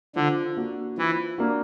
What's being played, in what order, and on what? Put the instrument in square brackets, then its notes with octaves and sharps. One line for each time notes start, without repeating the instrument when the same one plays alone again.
[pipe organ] D3 [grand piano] F3
[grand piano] A#3 D4 F#4
[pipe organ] E3 [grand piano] F3
[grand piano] A#3 D4 F#4